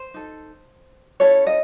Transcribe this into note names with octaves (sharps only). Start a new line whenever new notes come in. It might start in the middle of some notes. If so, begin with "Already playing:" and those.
Already playing: C5
D#4 A4
C#4 E4 A4 C#5
D#5